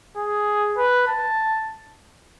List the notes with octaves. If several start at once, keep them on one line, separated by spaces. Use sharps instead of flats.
G#4
B4
A5